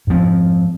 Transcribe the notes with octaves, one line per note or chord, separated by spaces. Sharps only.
G#2 F3 C4